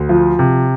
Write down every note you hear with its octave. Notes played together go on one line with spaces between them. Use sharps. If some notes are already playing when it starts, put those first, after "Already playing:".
Already playing: D2
F3
C3